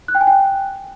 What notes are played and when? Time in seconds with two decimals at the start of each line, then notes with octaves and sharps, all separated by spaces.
0.08 F#6
0.15 G5
0.21 G#5
0.27 G5